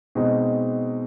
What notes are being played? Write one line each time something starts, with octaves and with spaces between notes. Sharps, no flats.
B2 G#3 C4 D#4